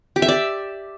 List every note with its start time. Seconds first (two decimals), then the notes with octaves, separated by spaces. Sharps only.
0.16 G4
0.22 E5
0.28 D5